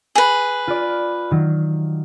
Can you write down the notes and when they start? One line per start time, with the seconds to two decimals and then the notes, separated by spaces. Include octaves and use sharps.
0.15 G#4 B4
0.68 F4 D5
1.31 D#3 F#3